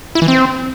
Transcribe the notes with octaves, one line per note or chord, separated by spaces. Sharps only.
E4
E3
C4